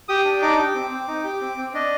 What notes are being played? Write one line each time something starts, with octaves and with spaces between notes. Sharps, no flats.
G4 D#6
D4
D#4 D6
G4
C4
C4
D#4
G4
C4
C4
D4 D#5